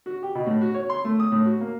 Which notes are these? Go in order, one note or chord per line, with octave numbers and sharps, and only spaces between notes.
F#4
G4
B2
A2
F#4
C#5
C6
A3
D#6
A2
F#4
A#3